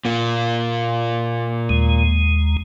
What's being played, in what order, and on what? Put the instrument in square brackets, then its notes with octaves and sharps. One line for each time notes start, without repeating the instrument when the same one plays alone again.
[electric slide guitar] A#2 A#3
[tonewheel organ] D#2 G#3